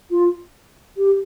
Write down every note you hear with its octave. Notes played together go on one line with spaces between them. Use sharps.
F4
G4